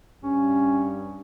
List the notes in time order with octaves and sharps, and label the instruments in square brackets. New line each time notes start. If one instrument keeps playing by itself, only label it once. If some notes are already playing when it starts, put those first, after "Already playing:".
[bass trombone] G2 [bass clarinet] C#4